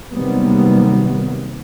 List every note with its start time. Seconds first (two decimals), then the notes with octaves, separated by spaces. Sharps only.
0.12 C3 D#3 F#3 G3 A#3 B3